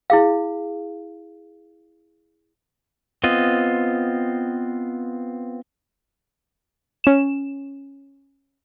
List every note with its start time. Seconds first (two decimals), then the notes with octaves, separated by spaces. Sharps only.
0.10 E4 G#4 F5
3.24 B3 C4 F4 D#5
7.04 C#4 E7